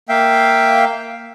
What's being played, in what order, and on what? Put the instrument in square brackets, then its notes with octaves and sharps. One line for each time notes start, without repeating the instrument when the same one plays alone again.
[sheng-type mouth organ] A#3 E5 F5 G5